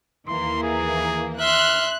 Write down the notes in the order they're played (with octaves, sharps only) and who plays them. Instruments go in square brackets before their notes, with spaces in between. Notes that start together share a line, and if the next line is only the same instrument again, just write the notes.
[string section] D#2 E3 A#3 [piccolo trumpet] C6
[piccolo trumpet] G#4
[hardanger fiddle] E5 C6 [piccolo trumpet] F6 [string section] F#6